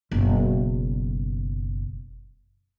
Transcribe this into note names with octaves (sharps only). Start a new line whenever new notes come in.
F#1 B2